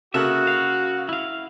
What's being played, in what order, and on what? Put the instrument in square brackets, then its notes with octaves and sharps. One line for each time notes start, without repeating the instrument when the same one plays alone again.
[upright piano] C#3 A#3 A4 [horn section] F#4 [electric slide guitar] E5
[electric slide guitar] F5
E4 F5